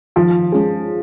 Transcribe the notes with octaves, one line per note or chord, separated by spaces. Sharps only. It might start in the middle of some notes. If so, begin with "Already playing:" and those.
D#3 F3
G#3 C#4 F4 G#4